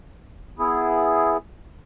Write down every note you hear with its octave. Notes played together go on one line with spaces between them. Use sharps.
B3 E4 G#4